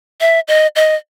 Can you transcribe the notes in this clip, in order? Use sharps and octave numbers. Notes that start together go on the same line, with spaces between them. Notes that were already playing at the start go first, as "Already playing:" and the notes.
E5
D#5
D#5